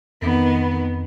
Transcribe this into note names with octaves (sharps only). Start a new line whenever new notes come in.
F2 D#3 B3